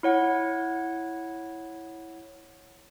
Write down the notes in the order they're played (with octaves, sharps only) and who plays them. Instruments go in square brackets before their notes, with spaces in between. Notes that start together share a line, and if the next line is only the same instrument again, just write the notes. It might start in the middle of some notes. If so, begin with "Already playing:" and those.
[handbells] E4 C#5 F#5